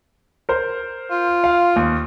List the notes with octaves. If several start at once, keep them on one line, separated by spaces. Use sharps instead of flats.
A#4 C5
F4
F5
D#2